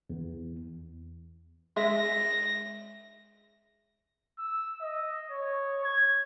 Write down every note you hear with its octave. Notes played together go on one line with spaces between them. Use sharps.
E2
G#3 E5 A#6
E6
D#5
C#5
G#6